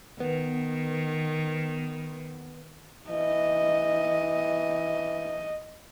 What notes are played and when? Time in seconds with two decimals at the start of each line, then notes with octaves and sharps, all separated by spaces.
0.20 D#3 B3
3.10 E3 D#5